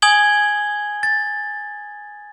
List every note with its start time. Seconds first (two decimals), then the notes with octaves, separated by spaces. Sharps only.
0.02 G#5 D#6 G#6 F#7 G7
1.03 A6